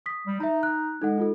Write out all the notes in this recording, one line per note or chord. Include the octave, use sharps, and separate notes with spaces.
D#6 B6
G3
D#4 E5 A#5
F#6
G#3 D#4 A4 F#5
D#4 F4 A4